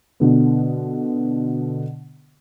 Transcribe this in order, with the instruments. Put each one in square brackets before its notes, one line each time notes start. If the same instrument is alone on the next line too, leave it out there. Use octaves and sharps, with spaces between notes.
[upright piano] B2 D3 B3